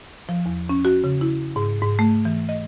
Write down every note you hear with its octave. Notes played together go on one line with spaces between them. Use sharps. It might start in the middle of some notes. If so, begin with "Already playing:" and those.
F3
E2
C#4
F#4
C#3
E4
G#2
G#2
A3
E3
D#5